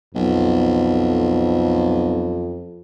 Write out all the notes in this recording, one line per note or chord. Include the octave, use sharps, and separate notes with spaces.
B1 F2